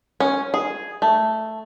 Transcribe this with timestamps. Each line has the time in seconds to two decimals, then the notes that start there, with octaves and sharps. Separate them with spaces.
0.20 C#4
0.54 G#4
1.02 A3